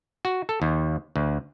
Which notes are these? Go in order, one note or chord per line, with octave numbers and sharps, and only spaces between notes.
F#4
A4
D#2
D2